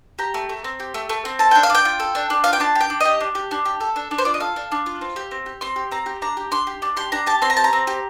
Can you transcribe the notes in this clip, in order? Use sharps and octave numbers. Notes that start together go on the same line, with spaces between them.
G4 A#5
A3
A3
C4
G4
A3
A3
C4
A4 A5
D4 G5
F5
D4
G5
F4
A4
D4
D4
F4 F5
G5
D4 A5
G4
G5
D4
G4 D#5
D4
G4
D4
G4
A4
D4
D4
C5
F4 D5
D#5
A4 F5
D4
D4
F4
C4
G4
C4
G4
C4 C6
G4
C4 A#5
G4
D4 A#5
G4
D4 C6
G4
D4
G4 C6
D4 A#5
G4 A5
C4 C6
A#5
G4 A5
A#5
C4
G4